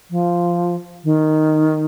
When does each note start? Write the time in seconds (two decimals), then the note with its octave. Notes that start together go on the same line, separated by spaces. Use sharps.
0.10 F3
1.04 D#3